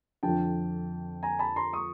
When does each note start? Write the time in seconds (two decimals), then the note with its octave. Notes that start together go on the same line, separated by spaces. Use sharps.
0.23 F2 D3 F3 G5 A5
1.23 G#5 A#5
1.39 A5 B5
1.56 A#5 C6
1.73 C#6 D#6